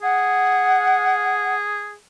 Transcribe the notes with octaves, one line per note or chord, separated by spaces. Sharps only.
G#4 F#5